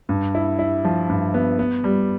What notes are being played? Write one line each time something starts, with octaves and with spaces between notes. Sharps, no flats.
G2
E4
E4
F3
G2
B3
B3
G3